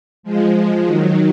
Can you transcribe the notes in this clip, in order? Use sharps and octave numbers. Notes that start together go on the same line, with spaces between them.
F3 G#3
D#3 F#3